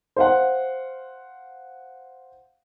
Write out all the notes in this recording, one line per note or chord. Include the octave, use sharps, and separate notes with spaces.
C5 F5 F#5